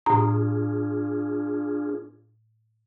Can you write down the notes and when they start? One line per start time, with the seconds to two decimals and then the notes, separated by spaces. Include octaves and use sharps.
0.06 A2 D4 F4 G#4 A#5